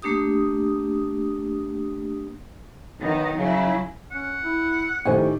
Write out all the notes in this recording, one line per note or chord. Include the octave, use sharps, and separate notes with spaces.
A3 A#3 D4 G4 D#6
B1 D#3 B3 D#4
C#3 F#3 E4
C#4 F#5
E4
A2 D#3 G4 C5 G#5